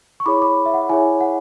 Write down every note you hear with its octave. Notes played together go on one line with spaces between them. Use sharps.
C#6
E4 G#4 C#5 B5 D6
B5 D6
E5
F#5
E4 G#4 C#5 E5 G#5
F#5